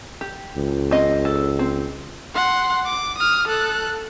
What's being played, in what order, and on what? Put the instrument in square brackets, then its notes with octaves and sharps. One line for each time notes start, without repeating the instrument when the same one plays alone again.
[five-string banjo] G4
[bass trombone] C#2
[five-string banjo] C4 D#5
A4
C4
[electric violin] F#5 C6
D6
D#6 F6
A4 F#6